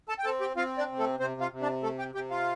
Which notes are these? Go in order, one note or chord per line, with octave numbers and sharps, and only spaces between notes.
A4 A5
G5
C4 A4 A5
G4 G5
C4 F4 F5
D4 D5
C3
A3 A4
C3 C4 C5
F4 F5
C3
D4 D5
A3 A4
G4 G5
C3 G4 G5
F4 F5